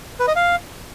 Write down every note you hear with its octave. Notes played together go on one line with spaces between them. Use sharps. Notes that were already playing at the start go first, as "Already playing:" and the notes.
B4
D#5
F5